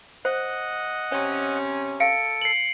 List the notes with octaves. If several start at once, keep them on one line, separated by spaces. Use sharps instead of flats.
C5 D#5 F#5
C3 C#4 C#5
A4 F5 C#7 D7
C7 F#7